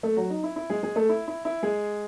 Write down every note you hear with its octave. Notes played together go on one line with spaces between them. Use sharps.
A3 A4
F#3 F#4
D#4
E4
E4
G#3 G#4
G#3 G#4
A3 A4
E4
E4
E4
G#3 G#4